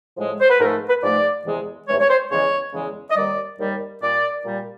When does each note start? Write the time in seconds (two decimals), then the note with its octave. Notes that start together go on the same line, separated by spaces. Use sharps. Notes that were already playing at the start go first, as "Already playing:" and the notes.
0.17 A2 F3 G#3
0.40 C5
0.49 B4
0.59 G#2 F3 A3 A#4
0.88 B4
1.02 G#2 F3 A3 D5
1.45 E2 C3 E3 G#3
1.87 E2 C3 E3 G#3 C#5
2.00 C#5
2.09 C5
2.30 E2 C#3 E3 G#3 C#5
2.73 E2 C#3 E3 G#3
3.10 D#5
3.16 D#2 D#3 G3 D5
3.59 D#2 D#3 G3
4.01 A#2 G3 D5
4.44 A#2 G3